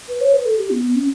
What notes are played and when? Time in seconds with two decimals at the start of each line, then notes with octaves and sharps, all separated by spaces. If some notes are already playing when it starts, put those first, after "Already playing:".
0.08 B4
0.21 C#5
0.33 B4
0.45 A4
0.58 G4
0.70 B3
0.82 B3
0.96 C#4